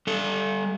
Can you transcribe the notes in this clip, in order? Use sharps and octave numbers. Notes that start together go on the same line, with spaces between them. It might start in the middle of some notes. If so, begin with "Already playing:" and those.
G3 A4